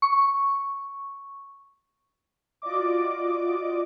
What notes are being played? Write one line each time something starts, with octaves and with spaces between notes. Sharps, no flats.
C#6
F4 F#4 D5 D#5 D6